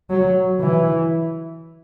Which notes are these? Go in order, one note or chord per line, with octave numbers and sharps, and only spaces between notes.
F#3
E3